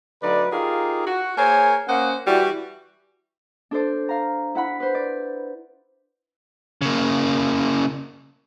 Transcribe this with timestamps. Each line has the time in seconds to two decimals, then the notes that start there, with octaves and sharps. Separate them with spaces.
0.22 D3 F#3 A3 D#4 B4 D5
0.51 D#4 F4 G4 G#4 A#4 F5
1.05 F#4
1.36 A#3 G#4 A#4 C5 C#5 G#5
1.87 A#3 C#4 C5 D#5 F#5
2.26 E3 G3 F#4
3.71 D4 A4 C5 D5
4.09 F5 A#5
4.55 E4 F#5 B5
4.80 B4 C5
4.95 D5
6.82 C#3 A#3